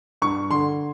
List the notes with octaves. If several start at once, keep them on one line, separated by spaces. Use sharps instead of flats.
G2 C#6
D3 C6